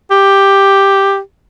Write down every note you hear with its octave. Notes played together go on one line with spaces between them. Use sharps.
G4